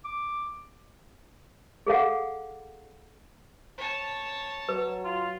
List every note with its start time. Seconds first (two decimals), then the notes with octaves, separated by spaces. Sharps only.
0.05 D6
1.87 G#4 A4 F5 F#5
3.78 C#5 A5
4.69 F#3 B4
5.05 F4